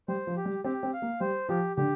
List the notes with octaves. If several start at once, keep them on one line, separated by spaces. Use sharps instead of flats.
G3 C5
F3
G4
G3
C4 G4
C4
F5
A#3
G3 C5
F3 G4
D3 G4